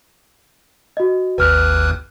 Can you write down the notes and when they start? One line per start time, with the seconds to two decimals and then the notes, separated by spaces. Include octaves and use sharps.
0.97 F#4 D#5
1.38 G#1 D#2 B4 F6 F#6